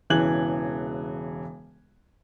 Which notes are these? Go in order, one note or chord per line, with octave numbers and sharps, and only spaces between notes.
E1 C#3 E3 F#6 G#6 F#7